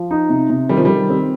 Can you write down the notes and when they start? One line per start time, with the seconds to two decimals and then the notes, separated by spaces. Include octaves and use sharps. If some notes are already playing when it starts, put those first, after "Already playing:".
Already playing: F3
0.11 D#4
0.30 C3
0.50 C3
0.69 D#3 G3
0.77 F3
0.85 D#3 G3
1.10 C4